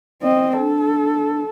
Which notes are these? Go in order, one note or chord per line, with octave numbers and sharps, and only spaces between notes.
C4 D#5
D4 A4